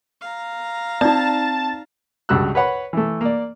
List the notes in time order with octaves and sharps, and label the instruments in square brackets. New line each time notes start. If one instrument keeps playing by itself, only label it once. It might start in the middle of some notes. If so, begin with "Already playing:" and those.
[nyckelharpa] F5 A#5
[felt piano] C4 [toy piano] D#4 D5 [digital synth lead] A5
[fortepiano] C#2 G2 F#4 E6 F#6
B4 C#5 F#5 B5
E3 A3
A#3 D5